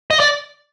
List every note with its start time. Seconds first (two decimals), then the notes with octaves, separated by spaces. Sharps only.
0.11 D#5
0.20 D5